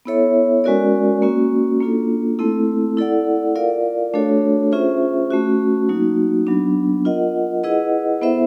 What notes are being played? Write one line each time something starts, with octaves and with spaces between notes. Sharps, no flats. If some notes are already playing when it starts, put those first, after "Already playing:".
B3 E4 A4 C#5 E5
G#3 C#4 F#4 A#4 D5
A#3 C#4 F#4
A#3 D4 F4 A4
A3 C4 E4 A4
E4 A4 D5 F#5
F4 A#4 D5 F5
A3 D4 F#4 A4 C#5
C#4 F4 G#4 C5 E5
A3 C#4 F#4
F#3 A#3 D#4 F#4
F#3 B3 D4
F4 A#4 D#5 F#5
E4 G#4 B4 D#5 F#5
B3 E4 A4 C5 E5